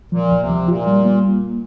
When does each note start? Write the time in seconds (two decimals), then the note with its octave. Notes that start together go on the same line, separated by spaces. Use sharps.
0.12 A#2 F3
0.30 D2
0.40 C3
0.49 F3
0.68 A#2 F4
0.86 G3
1.05 A#3